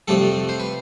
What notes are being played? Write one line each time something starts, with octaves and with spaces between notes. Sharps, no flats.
F2 C3 G3 A3 C4 A4
C5
B4